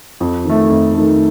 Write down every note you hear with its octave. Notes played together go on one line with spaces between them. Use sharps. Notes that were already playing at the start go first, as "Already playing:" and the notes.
F2
D#3 A3
F2
D#3 A3